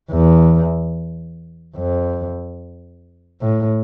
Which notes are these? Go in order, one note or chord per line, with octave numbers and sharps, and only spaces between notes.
E2
F2
A2